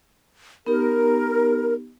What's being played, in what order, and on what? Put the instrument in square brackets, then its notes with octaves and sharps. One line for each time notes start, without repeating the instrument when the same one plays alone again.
[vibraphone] B3 D#4 G4 [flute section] A#4